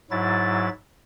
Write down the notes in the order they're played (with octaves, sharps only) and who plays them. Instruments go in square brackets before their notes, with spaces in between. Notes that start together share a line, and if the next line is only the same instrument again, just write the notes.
[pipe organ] G#2 F#3 E4 A6